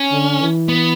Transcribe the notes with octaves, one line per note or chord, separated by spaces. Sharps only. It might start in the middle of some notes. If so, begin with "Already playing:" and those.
Already playing: C#4
D3
E3
B3